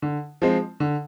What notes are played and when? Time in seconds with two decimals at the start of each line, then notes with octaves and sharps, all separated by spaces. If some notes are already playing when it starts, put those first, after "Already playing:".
0.02 D3
0.42 F3 G#3 C4
0.80 D3